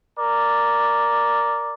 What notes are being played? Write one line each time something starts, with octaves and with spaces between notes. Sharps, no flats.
A#4 D5